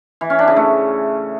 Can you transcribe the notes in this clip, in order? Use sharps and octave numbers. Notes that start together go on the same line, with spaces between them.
E3
C#4
D4
C#3
A3